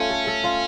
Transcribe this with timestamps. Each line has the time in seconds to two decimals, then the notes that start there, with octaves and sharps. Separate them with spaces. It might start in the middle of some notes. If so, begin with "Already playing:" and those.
Already playing: A3 C#4 F4
0.11 A4
0.27 A4
0.44 F4